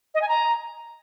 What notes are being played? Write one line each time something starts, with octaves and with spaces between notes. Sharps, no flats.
D#5
G#5
A#5